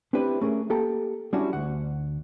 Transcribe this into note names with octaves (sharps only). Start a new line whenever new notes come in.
C4 D4 E4 G4 B4
A3 C#4 G#4 A#4
A#3 G4 A4 G5 A#5
G3 C#4 D4 E4 F#4
D2 F#5